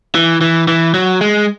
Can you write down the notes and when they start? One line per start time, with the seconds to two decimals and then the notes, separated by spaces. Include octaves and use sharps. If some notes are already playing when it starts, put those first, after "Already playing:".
0.15 E3
0.41 E3
0.68 E3
0.94 F#3
1.21 G#3